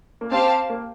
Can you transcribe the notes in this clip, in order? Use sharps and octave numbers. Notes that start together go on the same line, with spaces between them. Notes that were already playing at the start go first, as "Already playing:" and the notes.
A#3
C4 G4 C5 F5 A5
A#3